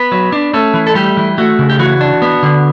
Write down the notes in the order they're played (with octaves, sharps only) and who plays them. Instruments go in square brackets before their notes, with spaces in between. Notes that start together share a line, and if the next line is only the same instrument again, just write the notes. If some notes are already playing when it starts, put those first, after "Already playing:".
Already playing: [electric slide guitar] B3 B4
F#3
D4
A3 C#4 A4
E3
A4
G3 A3 G4
E3
A3 F#4
C#3
G4
E3 F#4
D4
B3
D3